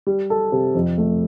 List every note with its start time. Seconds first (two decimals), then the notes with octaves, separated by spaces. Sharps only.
0.07 G3
0.30 A4
0.52 C3
0.75 F2
0.98 A3